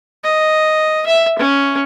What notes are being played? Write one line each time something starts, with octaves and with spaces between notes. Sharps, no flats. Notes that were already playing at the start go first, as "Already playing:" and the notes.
D#5
E5
C#4